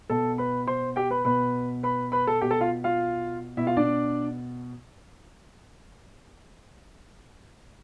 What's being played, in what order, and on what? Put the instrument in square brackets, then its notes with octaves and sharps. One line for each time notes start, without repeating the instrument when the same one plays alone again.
[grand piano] B2 A4 A5
B4 B5
C5 C6
G4 G5
B4 B5
B2 B4 B5
B4 B5
B4 B5
A4 A5
B2 G4 G5
A4 A5
F4 F5
F4 F5
B2 E4 E5
F4 F5
D4 D5